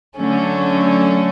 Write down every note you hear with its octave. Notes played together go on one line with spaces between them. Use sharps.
D3 F#3 A3 C#4